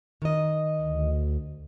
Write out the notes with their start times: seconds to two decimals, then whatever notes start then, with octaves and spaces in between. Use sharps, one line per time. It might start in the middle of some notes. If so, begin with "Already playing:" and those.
0.22 D#3 D#5
0.81 D2